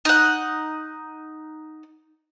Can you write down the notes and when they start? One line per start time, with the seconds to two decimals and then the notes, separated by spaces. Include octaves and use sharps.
0.05 D#4 F#5